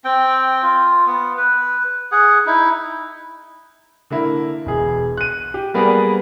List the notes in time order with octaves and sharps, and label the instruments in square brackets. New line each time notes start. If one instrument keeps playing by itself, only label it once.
[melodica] C4 G5
F4
B3
B4
G#4 F#5
D#4 E4
[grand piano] D3 A#3 E4
E1 G#4
F#6 D#7
G4
G3 A#3 B3 G#4 B4 D5